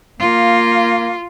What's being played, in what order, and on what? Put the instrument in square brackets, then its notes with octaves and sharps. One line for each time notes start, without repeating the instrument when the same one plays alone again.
[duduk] A#3 [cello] F4